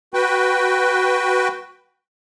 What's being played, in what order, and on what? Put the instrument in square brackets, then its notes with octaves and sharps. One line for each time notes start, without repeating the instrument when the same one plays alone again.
[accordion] F#4 B4 G5